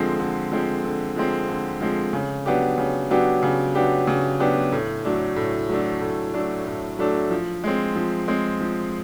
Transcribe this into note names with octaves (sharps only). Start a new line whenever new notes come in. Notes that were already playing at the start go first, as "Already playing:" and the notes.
Already playing: D3 F3 G#3 C4
D3
F3 G#3 C4
D3
F3 G#3 C4
D3
F3 G#3 C4
C#3
F#3 B3 D4 G4
C#3
F#3 B3 D4 G4
C#3
F#3 B3 D4 G4
C#3
F#3 B3 D4 G4
A2
F#3 A3 D4
A2
F#3 A3 D4
A2
F#3 A3 D4
A2
F#3 A3 D4
F3
G#3 C4
F3
G#3 C4
F3